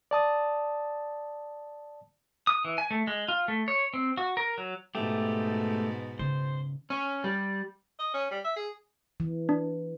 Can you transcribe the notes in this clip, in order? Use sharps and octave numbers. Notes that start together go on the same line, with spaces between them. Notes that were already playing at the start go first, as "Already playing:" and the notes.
D5 A5 D#6
D#6
E3
G#5
A3
G#3
F4
A3
C#5
C4
F#4
A#4
F#3
G#2 B2 A3 G4
C#3 C5
C#4
G3
D#5
C#4
G3
E5
G#4
E3
D4